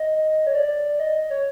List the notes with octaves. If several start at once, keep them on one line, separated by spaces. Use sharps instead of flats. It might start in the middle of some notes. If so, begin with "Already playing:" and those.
Already playing: D#5
C#5
D5
D#5
C#5